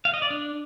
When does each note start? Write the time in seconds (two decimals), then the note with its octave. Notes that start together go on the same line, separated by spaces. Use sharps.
0.05 F5
0.14 D#5
0.22 D5
0.30 D4